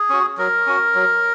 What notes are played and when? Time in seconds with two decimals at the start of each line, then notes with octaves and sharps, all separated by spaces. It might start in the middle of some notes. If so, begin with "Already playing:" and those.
Already playing: G#4
0.09 C#4 F#4
0.38 F#3 A#4
0.66 C#4 F#4
0.95 F#3